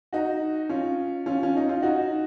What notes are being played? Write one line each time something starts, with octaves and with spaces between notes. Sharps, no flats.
D#4 F#4
C#4 F4
C#4 F4
C#4
D#4
F4
D#4 F#4